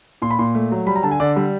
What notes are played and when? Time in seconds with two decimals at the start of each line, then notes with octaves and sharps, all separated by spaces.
0.22 A#2 C6
0.31 B5
0.39 A#2 C6
0.55 A3
0.72 F#3
0.87 G3 B5
0.96 A#5
1.03 D3 A5
1.11 G#5
1.20 D3 D5
1.36 G3